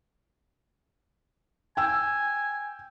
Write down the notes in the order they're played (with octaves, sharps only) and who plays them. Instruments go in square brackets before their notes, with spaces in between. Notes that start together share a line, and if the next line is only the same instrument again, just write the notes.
[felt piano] G5 E6 [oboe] G#5